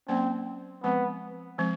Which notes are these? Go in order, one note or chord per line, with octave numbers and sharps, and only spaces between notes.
F#3 A#3 C4 C#4
F3 G#3 B3 C4
F3 G#3 C4